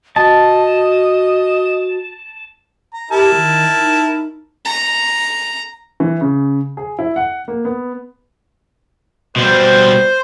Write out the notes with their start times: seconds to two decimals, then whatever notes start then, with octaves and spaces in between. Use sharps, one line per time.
0.16 F#4 D#5 A5
2.93 A#5
3.11 E4 G4 A#4 A5
3.35 D#3
3.77 D#4
4.65 A#5
6.00 E3
6.21 C#3
6.77 G#4
6.99 E4
7.16 F#5
7.48 A#3
7.65 B3
9.36 B2 G3 C5